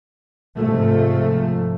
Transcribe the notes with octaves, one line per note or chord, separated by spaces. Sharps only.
G#2 C3 F3 A3